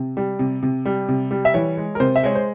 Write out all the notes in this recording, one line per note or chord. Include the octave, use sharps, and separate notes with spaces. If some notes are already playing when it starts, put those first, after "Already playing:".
Already playing: C3
G3
C3
C3
G3
C3
G3
E5
E3 C#5
G#3
A#4
C3 C5
E5
G#3 C#5
C5